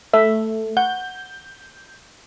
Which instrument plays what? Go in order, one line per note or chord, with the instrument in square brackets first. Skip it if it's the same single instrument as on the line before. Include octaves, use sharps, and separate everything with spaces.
[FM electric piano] A3 [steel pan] E5
[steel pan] F#5 [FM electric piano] G6